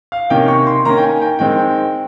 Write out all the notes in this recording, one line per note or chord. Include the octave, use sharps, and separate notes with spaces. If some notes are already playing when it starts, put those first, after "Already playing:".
F5
C3 D#3 A#3 C#4 G5
C#6
C6
D#3 A#3 C#4 A#5
G5
G#5
G5
D#3 G#3 C4 G5